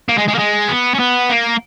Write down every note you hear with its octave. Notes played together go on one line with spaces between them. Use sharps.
A#3
G#3
G#3
A#3
G#3
B3
C#4
B3
A#3